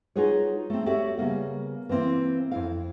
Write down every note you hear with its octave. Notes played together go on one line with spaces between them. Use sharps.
D#4 F4 F#4 G#4 B4 C#5
A3 C4
F#4 G4 A4 C#5 D5 E5
C#3 G3 A#3 B3
E3 A#3 C4 E4
F2 E4 F5